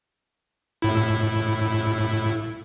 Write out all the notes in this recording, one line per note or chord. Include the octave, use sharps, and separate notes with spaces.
A2 E4